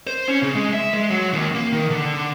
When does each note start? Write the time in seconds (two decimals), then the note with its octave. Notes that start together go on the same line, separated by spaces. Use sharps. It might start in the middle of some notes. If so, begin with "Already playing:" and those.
0.07 C5
0.28 C#4
0.42 C#3
0.55 G#3
0.73 E5
0.94 G#3
1.11 F#3
1.33 D#2
1.55 A#3
1.73 D#3
1.91 D3